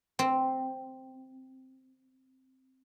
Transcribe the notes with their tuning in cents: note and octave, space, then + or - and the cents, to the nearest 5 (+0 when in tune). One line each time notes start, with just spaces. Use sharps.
C4 +0